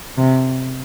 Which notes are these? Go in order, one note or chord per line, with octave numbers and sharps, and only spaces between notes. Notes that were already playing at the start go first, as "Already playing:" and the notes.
C3